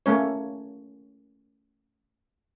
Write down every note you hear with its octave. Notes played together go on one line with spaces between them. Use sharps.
A3 A#3 C#4 C#5